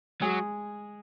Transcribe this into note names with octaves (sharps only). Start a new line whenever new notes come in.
F#3 G#3 G#4